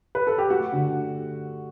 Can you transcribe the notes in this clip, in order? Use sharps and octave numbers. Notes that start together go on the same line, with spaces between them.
B4
A4
G4
A3 F#4
D3